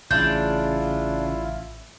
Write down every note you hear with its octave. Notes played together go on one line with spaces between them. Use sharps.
A1 C#3 D4 E4 F4 G6